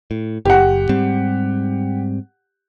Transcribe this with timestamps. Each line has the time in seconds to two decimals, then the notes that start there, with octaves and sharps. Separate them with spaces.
0.11 A2
0.45 F#1 G4 F#5
0.89 G#2 G3 C4